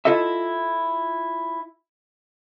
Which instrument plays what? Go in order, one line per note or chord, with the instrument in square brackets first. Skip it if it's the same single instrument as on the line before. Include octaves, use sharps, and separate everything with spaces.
[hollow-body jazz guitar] E4 F4 A4 D#5 E5